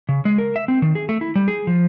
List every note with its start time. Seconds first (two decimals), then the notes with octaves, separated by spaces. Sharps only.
0.09 C#3
0.25 G#3
0.38 A#4
0.56 E5
0.68 C4
0.82 D#3
0.95 G#4
1.09 A3
1.21 E4
1.36 G3
1.48 G#4
1.67 F3